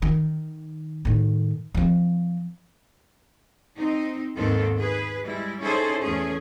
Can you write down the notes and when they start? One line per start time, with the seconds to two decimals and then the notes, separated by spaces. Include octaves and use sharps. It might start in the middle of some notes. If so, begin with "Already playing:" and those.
0.02 D#3
1.05 A2 D#3
1.75 F3 C4
3.77 C4 D#4
4.36 D#2 G#2 D#3 B3 C4 A4
4.78 G#4 B4
5.23 G3 G#3 E4
5.61 C#4 D#4 E4 G#4 A4 C5
6.02 E2 A3 C#4 G#4